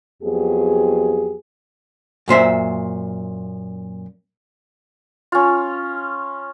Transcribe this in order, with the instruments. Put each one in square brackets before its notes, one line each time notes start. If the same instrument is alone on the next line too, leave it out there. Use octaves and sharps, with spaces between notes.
[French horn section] F2 F#3 B3 G4 G#4
[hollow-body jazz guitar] F#2 A#2 C5 E5
[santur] C#4 F4